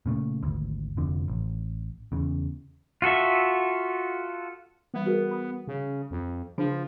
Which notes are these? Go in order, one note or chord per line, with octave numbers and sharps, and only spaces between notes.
A#2 C#3 A3
G#1 D2
F1 F2 D3
A1
E2 C#3
F4 F#4 A4 E5
E3 G3 B3
F#4 G#4 A#4
B5 D#6
C#3
F2
C#3 F3 D4 G#4